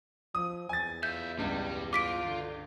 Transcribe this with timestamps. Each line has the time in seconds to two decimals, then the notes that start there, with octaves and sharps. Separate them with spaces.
0.35 F3 D#6
0.69 E2 G#5 A6
1.03 F4 E5 G6
1.39 C#2 G2 G3
1.93 F4 D6 B6 D7
2.25 D3